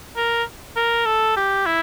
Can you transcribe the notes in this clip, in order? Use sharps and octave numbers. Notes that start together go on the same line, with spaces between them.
A#4
A#4
A4
G4
E4